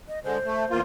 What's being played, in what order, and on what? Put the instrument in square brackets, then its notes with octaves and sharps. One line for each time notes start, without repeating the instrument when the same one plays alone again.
[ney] D#5
[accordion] D3 G#3 [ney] C5
[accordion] A3
E2 A#3 F4